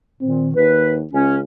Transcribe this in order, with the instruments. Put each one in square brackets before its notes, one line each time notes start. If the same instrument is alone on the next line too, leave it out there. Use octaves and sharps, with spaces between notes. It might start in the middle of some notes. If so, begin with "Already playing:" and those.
[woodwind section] A#2 D#3 [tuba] C4
[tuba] D#2 [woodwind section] B4
[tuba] C#2 [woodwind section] C#4